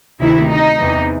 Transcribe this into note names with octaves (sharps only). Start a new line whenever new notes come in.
D2 C3 D#3 E4
D#4
E2 C3 E3